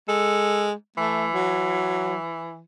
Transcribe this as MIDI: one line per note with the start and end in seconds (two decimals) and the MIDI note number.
0.08 0.73 56
0.08 0.67 69
0.98 2.60 52
0.98 1.27 57
1.33 2.15 54